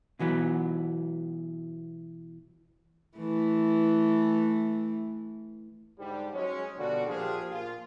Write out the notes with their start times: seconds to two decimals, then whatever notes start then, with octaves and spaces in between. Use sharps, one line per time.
0.19 B2 E3 F#3 B3
3.17 E3 A3
5.98 G#2 D3 G3
6.34 F#3 G#3 C#4
6.77 B2 D3 F3 G3 D4 F#4
7.07 A#2 F3 D4 F4 G4 G#4
7.51 A#2 F3 F4